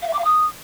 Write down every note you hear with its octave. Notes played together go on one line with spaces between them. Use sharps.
F5
E5
D6
F5
D#6